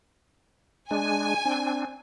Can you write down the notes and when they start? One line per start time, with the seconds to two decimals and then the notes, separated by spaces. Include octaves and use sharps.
0.91 G#3 D4 G#5
1.45 C4 D4